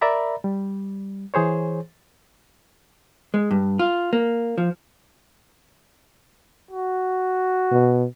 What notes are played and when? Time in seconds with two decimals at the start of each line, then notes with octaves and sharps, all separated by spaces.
0.01 A#4 D5 E5 A#5 B5
0.44 G3
1.34 E3 G#4 C5 C#5
3.34 G#3
3.51 G2
3.79 F4
4.13 A#3
4.58 F3
6.71 F#4
7.71 B2